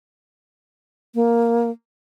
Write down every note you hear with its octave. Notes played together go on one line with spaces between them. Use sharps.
A#3